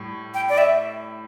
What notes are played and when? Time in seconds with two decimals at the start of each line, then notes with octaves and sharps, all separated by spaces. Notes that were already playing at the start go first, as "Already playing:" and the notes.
Already playing: A2 G3
0.34 G5
0.49 D5
0.58 E5